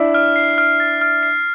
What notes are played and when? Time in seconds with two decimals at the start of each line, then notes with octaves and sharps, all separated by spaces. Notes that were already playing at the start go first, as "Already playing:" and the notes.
Already playing: D4 E4
0.14 F6
0.36 C7
0.58 F6
0.80 A6
1.01 F6
1.23 C7